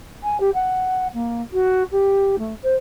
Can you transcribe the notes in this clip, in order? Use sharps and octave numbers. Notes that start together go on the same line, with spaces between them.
G#5
G4
F#5
A#3
F#4
G4
A3
C5